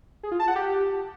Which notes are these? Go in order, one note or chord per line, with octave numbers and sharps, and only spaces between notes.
G#4
F4
A5
F#5
G4